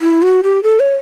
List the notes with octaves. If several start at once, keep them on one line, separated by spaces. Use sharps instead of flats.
E4
F#4
G4
A4
C#5